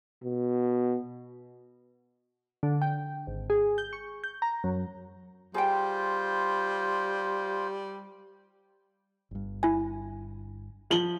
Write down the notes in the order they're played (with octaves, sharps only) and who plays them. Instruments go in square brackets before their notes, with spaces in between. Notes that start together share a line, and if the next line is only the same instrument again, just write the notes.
[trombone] B2
[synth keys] D3
G5
G#1
G#4
G6
C#6
G6
A#5
F#2
[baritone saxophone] G3 [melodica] F4 C5 [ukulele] G#4 G5
[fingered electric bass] G1 G2
[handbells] E4 G#5
[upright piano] F3 F#7 G7